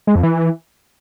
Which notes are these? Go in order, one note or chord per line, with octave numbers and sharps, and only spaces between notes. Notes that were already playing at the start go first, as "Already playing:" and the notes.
G#3
F2
E3